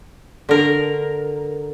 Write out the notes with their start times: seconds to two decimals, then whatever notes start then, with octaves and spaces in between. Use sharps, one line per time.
0.49 D3 A#4